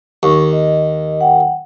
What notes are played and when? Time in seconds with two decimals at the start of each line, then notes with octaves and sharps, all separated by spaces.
0.23 D#2 C#6
0.53 D#5
1.21 F#5 G5